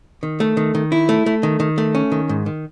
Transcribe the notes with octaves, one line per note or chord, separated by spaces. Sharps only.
D#3
A3
D#3
D#3
E4
A3
A3
D#3
D#3
A3
C#4
D#3
G#2
D#3